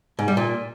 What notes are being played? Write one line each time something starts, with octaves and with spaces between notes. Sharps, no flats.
G#2
G3
A#2